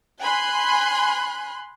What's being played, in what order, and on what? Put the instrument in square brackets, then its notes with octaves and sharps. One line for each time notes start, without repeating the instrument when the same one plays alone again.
[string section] G#5 B5 C6 F#6